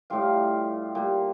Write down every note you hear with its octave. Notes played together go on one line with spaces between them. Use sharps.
A2 G3 F4 F5
A#2 G3